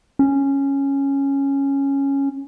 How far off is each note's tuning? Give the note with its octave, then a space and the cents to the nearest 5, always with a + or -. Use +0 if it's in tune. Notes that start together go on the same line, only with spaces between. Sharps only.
C#4 -5